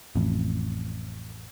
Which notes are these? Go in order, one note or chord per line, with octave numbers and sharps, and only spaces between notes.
A1 F2